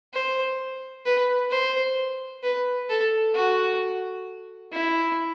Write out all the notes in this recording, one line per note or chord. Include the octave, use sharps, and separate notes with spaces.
C5
B4
C5
B4
A4
F#4
E4